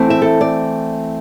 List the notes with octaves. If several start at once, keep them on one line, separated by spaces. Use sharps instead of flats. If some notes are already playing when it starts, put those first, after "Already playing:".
Already playing: E3 A3 C4
E5
A4
D5